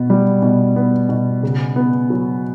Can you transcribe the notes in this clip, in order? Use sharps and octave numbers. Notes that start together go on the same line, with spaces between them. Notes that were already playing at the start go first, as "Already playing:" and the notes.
Already playing: B2 B3
G3
B2
B3
B2
C#3
B3
F#3